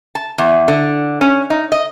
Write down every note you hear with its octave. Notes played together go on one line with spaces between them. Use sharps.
A5
E2
D3
C#4
D#4
D#5